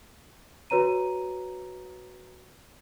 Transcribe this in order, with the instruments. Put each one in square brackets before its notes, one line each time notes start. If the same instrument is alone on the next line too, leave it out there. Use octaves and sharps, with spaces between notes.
[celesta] F#4 B4 C#5 A#5 D#7